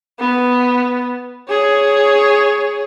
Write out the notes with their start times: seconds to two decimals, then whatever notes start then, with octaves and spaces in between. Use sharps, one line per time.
0.20 B3
1.49 G#4 C#5